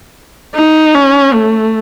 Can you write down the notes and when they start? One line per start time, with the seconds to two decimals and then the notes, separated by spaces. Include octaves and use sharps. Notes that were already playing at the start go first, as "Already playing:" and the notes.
0.56 D#4
0.95 C#4
1.34 A3